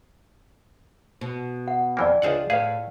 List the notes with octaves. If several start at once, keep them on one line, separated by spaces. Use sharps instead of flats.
B2
F#5
F2 E3 A#3 D5 G#5
C#2 D4 F4 G#4 C5 F#5
A2 G#4 B4 F5